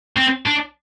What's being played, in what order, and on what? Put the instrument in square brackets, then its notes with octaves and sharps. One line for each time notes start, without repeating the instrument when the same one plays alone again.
[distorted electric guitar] C4
D4